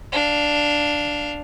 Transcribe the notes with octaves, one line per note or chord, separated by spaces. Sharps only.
D4 F5